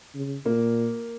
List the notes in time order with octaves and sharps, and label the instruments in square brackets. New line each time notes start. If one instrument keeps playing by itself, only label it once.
[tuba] C#3
[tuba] A#2 [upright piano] A#3